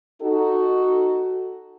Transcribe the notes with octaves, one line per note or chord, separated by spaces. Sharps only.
D#4 F#4 A4